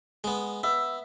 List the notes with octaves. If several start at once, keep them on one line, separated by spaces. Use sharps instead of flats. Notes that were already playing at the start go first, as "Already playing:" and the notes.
G#3 B3
B3 E5